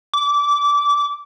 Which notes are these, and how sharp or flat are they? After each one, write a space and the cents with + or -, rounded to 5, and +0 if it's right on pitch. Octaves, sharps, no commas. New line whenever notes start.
D6 -20